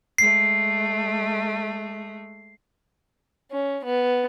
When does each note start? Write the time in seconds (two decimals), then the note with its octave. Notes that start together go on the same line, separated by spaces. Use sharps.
0.18 G#3 A3 C7
3.50 C#4
3.84 B3